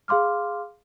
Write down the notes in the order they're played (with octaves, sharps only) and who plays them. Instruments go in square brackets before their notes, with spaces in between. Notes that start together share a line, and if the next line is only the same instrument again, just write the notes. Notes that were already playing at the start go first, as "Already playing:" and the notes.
[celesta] G#4 F5 C6 D6 F6